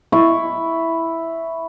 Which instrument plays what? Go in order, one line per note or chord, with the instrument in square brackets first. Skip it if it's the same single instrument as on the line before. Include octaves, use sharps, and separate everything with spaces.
[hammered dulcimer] E4 C#6